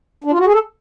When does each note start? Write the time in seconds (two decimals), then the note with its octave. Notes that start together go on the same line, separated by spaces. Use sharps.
0.24 D4
0.31 F4
0.38 F#4
0.45 G#4
0.53 A4